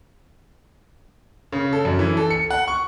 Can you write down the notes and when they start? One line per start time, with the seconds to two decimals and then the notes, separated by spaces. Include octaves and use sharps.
1.52 C#3
1.73 A4
1.85 F#2
1.99 E3
2.17 A4
2.30 C#7
2.50 F#5
2.68 C#6